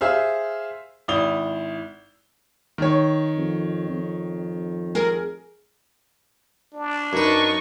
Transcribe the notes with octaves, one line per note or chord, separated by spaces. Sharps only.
G#4 C5 E5 F5
G#1 E4 D#6 F7 G7
D#3 C#5
F2
F2
G#4 A#4
D4
F#2 D#4 B4 C#6